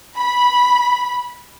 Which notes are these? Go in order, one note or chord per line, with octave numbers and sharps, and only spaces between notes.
B5